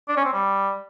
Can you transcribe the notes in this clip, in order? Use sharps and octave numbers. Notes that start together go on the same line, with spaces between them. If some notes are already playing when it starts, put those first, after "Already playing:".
D4
C#4
C4
G3